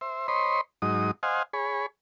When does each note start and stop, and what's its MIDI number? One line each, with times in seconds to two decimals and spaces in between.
0.01 0.27 72
0.01 0.27 76
0.28 0.61 72
0.28 0.61 73
0.28 0.61 75
0.28 0.61 83
0.28 0.61 84
0.82 1.11 44
0.82 1.11 54
0.82 1.11 63
0.82 1.11 87
1.23 1.43 72
1.23 1.43 75
1.23 1.43 77
1.23 1.43 78
1.23 1.43 80
1.53 1.86 68
1.53 1.86 73
1.53 1.86 83